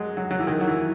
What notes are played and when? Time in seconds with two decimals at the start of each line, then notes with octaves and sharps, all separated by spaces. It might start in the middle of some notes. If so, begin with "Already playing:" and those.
Already playing: F#3 G#3
0.17 F#3
0.31 F#3
0.39 E3
0.47 D#3
0.61 F#3
0.67 E3